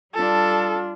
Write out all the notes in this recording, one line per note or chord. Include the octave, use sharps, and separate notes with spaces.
G3 D4 F4 A4